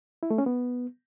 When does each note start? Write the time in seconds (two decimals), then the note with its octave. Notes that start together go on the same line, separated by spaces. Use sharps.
0.23 E4
0.30 A3
0.38 C#4
0.46 B3